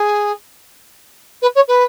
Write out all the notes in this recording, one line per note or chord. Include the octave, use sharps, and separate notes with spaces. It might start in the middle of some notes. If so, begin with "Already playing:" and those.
Already playing: G#4
B4
C#5
B4